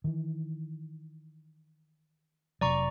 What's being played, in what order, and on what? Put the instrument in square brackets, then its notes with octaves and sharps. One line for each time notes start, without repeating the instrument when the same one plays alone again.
[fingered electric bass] D#3 E3
[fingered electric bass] F1 C3 F#3 [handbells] D5 A#5 C#6